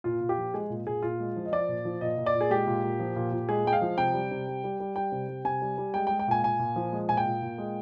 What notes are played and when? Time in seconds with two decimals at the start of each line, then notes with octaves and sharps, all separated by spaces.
0.04 A#2 F4
0.21 A#2
0.29 G4
0.38 F3
0.54 G#3 G#4
0.70 A#2
0.86 A#2 G#4
1.02 A#2 F4
1.20 G#3
1.36 F3
1.45 D#5
1.52 F3 D5
1.68 A#2
1.85 F3
2.01 A#2 D#5
2.18 A#2
2.26 D5
2.34 A#2
2.41 G#4
2.50 G#3 G4
2.67 A#2
2.83 A#2
3.00 F3
3.16 A#2
3.32 A#2
3.49 G#3 G#4
3.65 G#3 G5
3.73 F5
3.81 F3
3.98 C3 G5
4.14 G3
4.31 C3
4.48 G3
4.64 G3
4.80 G3
4.96 G3 G5
5.12 C3
5.28 G3
5.45 C3 G#5
5.62 G3
5.78 G3
5.94 G#3 G5
6.07 G5
6.10 G#3
6.19 G5
6.28 A#2 G#5
6.43 A#2 G#5
6.59 A#2
6.76 F3
6.92 G#3
7.09 A#2 G#5
7.17 G5
7.26 A#2
7.42 A#2
7.58 G#3